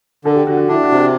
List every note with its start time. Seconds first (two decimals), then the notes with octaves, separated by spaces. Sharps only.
0.25 D3 A4
0.36 G4
0.47 D3 F#4
0.57 F#4
0.69 D4 E4
0.83 F#4
0.91 C3
0.98 G4